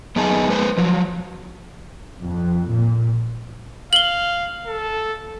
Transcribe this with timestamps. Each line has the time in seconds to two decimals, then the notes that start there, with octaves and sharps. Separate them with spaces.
0.16 F#2 B3 D#4 G#4 A5
0.48 G#3 B4 C5
0.77 F3 F#3
2.22 F2
2.68 A#2
3.93 F5 F#7 G7
4.67 A4